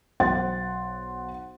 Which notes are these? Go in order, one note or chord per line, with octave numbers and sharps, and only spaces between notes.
B1 C5 F#5 C6 A6